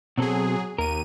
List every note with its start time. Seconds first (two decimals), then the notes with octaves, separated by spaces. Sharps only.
0.18 B2 F#3 C4 G#4 A4
0.78 D#2 A#4 D#7